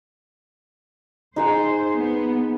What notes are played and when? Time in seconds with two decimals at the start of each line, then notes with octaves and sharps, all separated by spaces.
1.36 D#4 G#4 C5 F#5
1.94 B3